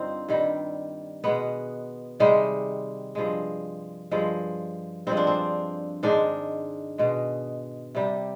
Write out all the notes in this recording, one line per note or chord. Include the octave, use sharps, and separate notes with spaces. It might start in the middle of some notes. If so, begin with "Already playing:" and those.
Already playing: G2 D3 C4 D#4 F4
G2 D#3 G3
B2 G#3 B3
C3 D#3 G3 G#3
G2 F3 G#3
G2 F3 G#3
G2 F3 G#3 C4
D4
C4
G#2 D#3 G#3 D4
B2 G#3
C3 G3